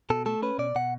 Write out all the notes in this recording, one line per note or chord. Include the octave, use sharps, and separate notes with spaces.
B2 A4
A3 A4
C#4 B4
B2 D5
B2 F#5